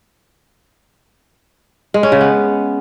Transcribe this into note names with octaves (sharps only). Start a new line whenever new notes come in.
G#3
C#4
C#3
B3